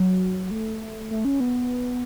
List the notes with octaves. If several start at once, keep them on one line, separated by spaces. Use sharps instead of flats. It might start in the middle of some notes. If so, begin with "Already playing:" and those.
Already playing: F#3
A3
A3
C#4
B3